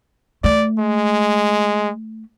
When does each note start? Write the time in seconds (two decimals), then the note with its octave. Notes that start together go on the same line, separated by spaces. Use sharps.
0.44 A3 D5
0.78 G#3